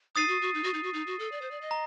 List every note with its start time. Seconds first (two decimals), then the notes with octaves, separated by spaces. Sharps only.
0.16 D#4 D#6 A6 C7 D#7
0.28 F#4
0.42 F#4
0.54 D#4
0.64 F#4
0.74 D#4
0.83 F#4
0.94 D#4
1.07 F#4
1.19 A4
1.32 D5
1.42 C5
1.51 D5
1.61 D#5
1.71 A#5